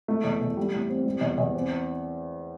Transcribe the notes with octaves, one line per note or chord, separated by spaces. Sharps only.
A3
E2
E2
G3
A2
C4
G3
E2
E2
C4